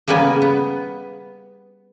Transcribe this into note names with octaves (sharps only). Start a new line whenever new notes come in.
C#3 G3 A#3 B3 G#5
B3